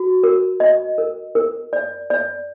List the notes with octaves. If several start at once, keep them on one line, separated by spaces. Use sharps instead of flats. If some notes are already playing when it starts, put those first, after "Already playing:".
Already playing: F#4
A#4
D#5
A#4
A#4
D5
D5